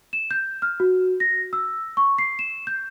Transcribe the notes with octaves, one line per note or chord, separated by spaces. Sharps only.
E7
G6
F6
F#4
A#6
E6
C#6
C7
E7
G6